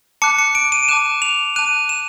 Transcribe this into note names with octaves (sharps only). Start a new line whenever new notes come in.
A5 D6 F#6 C#7
C#7
D7
D#7
A5 D6 F#6 E7
F7
A5 D6 F#6 D#7
E7